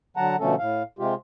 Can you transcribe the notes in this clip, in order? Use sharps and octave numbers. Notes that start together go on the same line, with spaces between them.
D3 F#3 F#5 A5 A#5
B2 D3 F3 A3 C#4 A4
A2 F5
C3 G#3 F4 G4